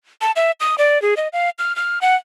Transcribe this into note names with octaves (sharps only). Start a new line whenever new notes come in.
A5
E5
D#6
D5
G#4
D#5
F5
F6
F6
F#5